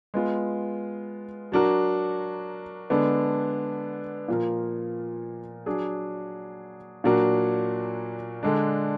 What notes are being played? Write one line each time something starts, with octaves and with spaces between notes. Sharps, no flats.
G#3 B3 F4
F#3 D4 F#4 A#4
D3 G#3 B3 D4
A#2 F3 A#3 F4 A#4
F#3 D4 G#4
A#2 F#3 D4 F#4 A#4
D3 G#3 D4